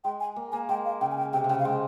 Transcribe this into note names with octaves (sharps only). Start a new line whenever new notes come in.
G#3 G5
G#5
A#3
A#3 G#5
G#3 G5
F5
C#3 G5
G#5
G5
C3 G5
C3
C#3 G5
F5
G#3 G5